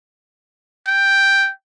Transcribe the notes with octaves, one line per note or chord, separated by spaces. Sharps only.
G5